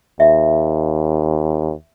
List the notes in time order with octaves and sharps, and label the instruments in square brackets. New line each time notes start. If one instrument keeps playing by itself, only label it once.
[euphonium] D#2 [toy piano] E5